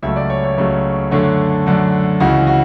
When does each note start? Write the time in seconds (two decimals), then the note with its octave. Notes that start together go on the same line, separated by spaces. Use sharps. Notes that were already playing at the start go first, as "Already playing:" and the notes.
0.02 C#2 C#3 F#3 A3 E5
0.16 D5
0.30 C#5
0.44 C#5
0.57 C#2 C#3 F#3 A3
1.11 F#2 D3 A3 D4 C#5
1.66 F#2 D3 A3 D4
2.20 C#2 C#3 E3 F#4
2.47 F#4